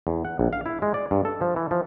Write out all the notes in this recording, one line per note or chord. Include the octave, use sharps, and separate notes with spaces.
E2
F#5
A#1
F5
E4
G#3
D5
G2
A4
F3
E3
F3